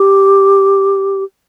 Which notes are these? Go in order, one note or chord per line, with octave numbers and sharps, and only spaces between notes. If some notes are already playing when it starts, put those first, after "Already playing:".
Already playing: G4